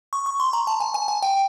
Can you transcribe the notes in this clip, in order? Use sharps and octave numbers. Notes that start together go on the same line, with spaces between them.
C#6
C#6
C6
A#5
A5
G#5
G#5
G#5
G5